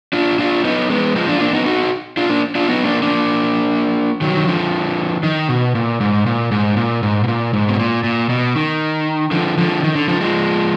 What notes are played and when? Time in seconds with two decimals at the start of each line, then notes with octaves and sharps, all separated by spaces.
0.13 D4 F4
0.39 D4 F4
0.64 B3 D#4
0.90 G#3 B3
1.16 F3 G#3
1.28 D4 F4
1.40 A#3 D4
1.53 B3 D#4
1.66 D#4 F#4
2.17 D4 F4
2.29 A#3 D4
2.55 D4 F4
2.68 B3 D#4
2.85 A#3 D4
3.02 A#3 D4
4.21 D#3 F#3
4.37 D#3
4.47 D3 F3
5.23 D#3
5.49 B2
5.75 A#2
6.01 G#2
6.26 A#2
6.51 G#2
6.77 A#2
7.03 G#2
7.24 B2
7.28 A#2
7.53 G#2
7.69 B2
7.79 A#2
8.04 A#2
8.29 B2
8.56 D#3
9.31 D3 F3
9.58 D3 F3
9.83 D#3
9.95 D3
10.08 D3 F3
10.21 F3 G#3